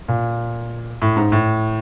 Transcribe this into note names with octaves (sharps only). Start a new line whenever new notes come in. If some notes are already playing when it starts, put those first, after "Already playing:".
A#2
A2
G#2
A2